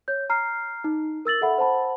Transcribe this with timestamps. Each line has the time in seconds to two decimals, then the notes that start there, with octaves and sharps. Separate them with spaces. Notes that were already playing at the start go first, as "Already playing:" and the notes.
0.08 C#5 G6
0.30 A#5 F6 C7
0.84 D#4
1.25 A#4 E6 A6 F#7
1.41 A4 E5 F#5 B5
1.58 C5 F#5 A5 B5